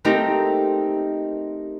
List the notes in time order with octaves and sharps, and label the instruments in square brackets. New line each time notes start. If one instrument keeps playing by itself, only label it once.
[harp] A3 C4 D#4 G4 A#4